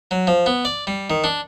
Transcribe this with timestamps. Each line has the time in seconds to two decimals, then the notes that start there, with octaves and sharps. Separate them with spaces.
0.11 F#3
0.27 F3
0.46 B3
0.65 D5
0.87 G3
1.10 D#3
1.24 D4